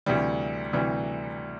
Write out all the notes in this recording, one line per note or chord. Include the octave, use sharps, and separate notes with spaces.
D2 C3 E3 G3
D2 C3 E3 G3